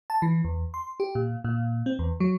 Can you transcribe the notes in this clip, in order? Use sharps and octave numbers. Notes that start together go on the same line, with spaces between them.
A5
E3
E2
C6
G4
A#2
A#2
C4
E2
F#3